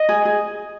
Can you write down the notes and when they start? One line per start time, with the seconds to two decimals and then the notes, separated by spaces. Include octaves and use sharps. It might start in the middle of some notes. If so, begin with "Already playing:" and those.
Already playing: D#5
0.09 G#4
0.25 G#4